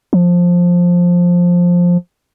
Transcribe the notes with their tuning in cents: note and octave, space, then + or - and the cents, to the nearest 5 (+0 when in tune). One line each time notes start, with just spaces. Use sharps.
F3 +10